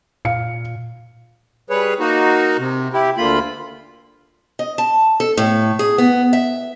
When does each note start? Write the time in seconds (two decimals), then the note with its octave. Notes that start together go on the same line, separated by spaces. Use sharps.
0.25 A#2 F5 C#7
1.70 G3 G#4 B4 C#5
2.00 A#3 D#4 F#4
2.58 C3
2.93 E4 G4
3.17 D2 D3 A#3 F4 B5
4.59 D#5
4.78 A5
5.20 A4
5.37 A2
5.79 G#4
5.98 B3
6.33 E5